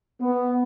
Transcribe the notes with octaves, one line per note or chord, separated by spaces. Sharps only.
B3